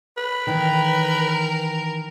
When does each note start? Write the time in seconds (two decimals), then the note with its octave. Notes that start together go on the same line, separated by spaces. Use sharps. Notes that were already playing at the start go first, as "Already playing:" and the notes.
0.17 B4
0.47 D#3 E3 A#4